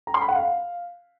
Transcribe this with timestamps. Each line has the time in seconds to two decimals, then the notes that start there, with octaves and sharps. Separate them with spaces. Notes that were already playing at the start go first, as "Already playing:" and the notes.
0.07 A#5
0.14 C6
0.21 B5
0.28 F#5
0.36 F5